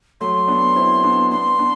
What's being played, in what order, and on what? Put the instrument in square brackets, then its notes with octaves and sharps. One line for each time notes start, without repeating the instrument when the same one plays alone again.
[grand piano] F#3 A3 [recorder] C6
[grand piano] B3 D4
C4 E4
B3 D4
[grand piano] B3 D4 [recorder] C6
[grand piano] B3 D4